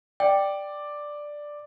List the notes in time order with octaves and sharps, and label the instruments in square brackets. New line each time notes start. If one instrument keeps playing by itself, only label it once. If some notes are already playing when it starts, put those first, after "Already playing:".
[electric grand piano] D5 [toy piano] G5